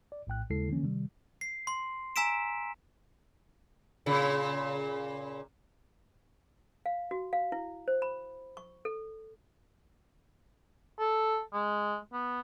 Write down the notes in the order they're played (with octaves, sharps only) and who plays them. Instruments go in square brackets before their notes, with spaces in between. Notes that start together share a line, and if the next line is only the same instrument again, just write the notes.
[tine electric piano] D5
A#1 A2 G5 F#6
D#2 C#3 G#3 E4 A4 C7
D3 E3 F3 A#3 C#4
C3 D#3 G3
[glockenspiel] C7
C6
G#5 A#5 E6 B6 D7 E7
[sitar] A#2 C#3
[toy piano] F5
F#4
F5
E4
C5
B5
C#6
A4
[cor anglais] A4
G#3
B3